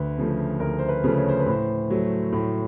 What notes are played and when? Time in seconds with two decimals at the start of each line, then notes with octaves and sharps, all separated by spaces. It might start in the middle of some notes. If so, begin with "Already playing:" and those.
Already playing: D2 B4
0.18 C#3 F3 A3
0.60 D2 A#4
0.79 C5
0.89 B4
1.04 C#3 F3 A3
1.17 C#5
1.29 C5
1.40 B4
1.46 A2 C5
1.90 F#3 A3
2.32 A2